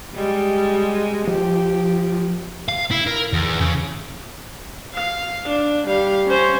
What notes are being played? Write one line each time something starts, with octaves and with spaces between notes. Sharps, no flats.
G3 G#3
F3 G4
F5
E4
A#4
E2
C#3
F5
D4
G3 F5
C#4 C5